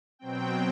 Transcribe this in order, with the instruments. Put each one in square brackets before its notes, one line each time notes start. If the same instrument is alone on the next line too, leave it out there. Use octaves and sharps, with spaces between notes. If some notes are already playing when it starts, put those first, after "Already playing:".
[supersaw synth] B2 F#3 C4 G5